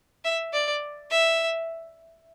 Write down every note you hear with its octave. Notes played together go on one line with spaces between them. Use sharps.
E5
D5
E5